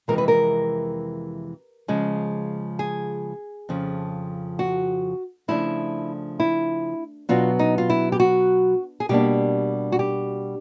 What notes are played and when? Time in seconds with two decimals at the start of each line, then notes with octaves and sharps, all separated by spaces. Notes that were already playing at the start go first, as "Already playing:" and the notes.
0.08 F2 C3 E3 G#3 A#4
0.18 B4
0.28 A#4
1.88 C#3 F3 G#3
2.79 G#4
3.69 F2 C#3 F3
4.59 F#4
5.48 C#3 F3 A3 D4 E4
6.40 E4
7.29 B2 F#3 B3 D4 F4
7.59 D#4
7.78 F4
7.90 E4
8.12 G4
8.20 F#4
9.00 G#4
9.09 B2 G3 A#3 D4 G4
9.92 F#4
9.99 G4